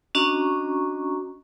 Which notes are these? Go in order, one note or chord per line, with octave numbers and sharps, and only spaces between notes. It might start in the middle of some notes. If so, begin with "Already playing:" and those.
C#4 D4 F#4 D#5 A#5 C#6